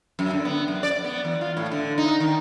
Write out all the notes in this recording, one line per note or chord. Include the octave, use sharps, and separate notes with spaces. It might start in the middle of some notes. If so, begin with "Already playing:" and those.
F#2
D3
B3
F#2
D5
B3
E2
F4
A2
D3
D#4
D#3